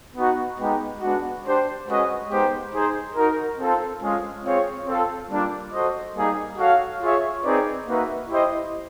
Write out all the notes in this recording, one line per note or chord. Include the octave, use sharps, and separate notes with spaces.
B3 D#4 F#4
G#3 B3 D#4 G4
G#3 B3 D4 F#4
D4 G4 C5
G#3 C#4 F#4 B4 D#5
G#3 B3 D#4 G4 C5
D#4 G#4 C5
D#4 F#4 A#4
C4 F4 A4 C5
G#3 C#4 F4 G#4
C4 F4 G#4 C#5
C4 F4 A4 C5
G3 A#3 D4 F4
F#4 A4 C5 D#5
G3 A#3 D#4 G#4
F#4 A4 C#5 F5
F4 G#4 C#5 E5
C4 D#4 G#4 B4 D5
A#3 D#4 F#4 B4 E5
E4 G4 C5 D#5